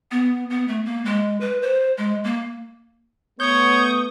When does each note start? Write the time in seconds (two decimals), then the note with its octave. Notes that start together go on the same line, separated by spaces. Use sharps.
0.11 B3
0.50 B3
0.68 A3
0.86 A#3
1.05 G#3
1.41 B4
1.62 C5
1.98 G#3
2.24 A#3
3.40 A3 B3 C#5 C#6 D#6 G6